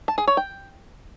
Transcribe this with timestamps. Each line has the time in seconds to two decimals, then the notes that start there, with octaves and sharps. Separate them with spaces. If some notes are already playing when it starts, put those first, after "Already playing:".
0.08 A5
0.18 G#4
0.28 C#5
0.37 G5